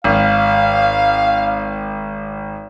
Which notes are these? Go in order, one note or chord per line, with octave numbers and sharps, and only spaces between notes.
G#1 F5